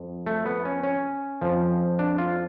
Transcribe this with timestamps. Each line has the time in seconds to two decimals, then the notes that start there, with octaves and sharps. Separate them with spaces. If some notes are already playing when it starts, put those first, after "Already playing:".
Already playing: F2
0.26 A3
0.46 B3
0.65 C#4
0.83 C#4
1.41 F2 F3
1.99 D4
2.18 F4